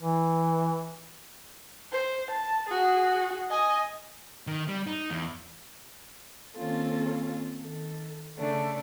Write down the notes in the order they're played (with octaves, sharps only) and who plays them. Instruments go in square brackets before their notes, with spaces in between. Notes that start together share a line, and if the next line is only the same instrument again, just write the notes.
[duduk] E3
[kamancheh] C5
A5
F#4 G#4
D#5 G#5
[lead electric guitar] D#3
G3
D#4
E2
[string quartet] D#3 A#3 C4 C#4 F4 A4
D#3 A4
C#3 A3 D4